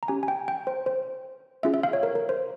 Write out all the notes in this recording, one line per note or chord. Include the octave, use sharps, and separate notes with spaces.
A#5
C#4 G4 G#5
G#5
G5
G5
C5
C5
C#4 F4 G#4 E5
E5
F5
C#5
A#4
A#4
C5